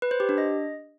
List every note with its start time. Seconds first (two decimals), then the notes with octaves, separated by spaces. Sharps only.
0.02 B4
0.11 C5
0.20 G4
0.29 D4
0.38 D#5